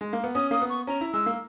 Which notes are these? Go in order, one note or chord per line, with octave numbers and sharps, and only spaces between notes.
G#3
A#3
B3
C#4 D#6
A#3 D#6
B3
C#6
C#4 A#5
E4
G#3 E6
A#3